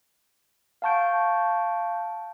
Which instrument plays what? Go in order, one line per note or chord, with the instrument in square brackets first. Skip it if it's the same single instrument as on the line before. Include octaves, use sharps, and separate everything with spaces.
[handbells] F5 F#5 A5 C#6 G6 D7